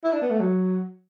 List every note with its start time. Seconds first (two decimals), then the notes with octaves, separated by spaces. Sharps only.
0.04 E4
0.13 D4
0.22 B3
0.31 A3
0.40 F#3